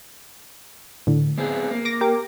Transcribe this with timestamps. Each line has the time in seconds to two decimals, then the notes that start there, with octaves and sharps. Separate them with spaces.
1.07 A2 D3
1.38 B3 C4 G#4
1.71 A#3
1.85 D6 A#6
2.01 G4 A#4 D6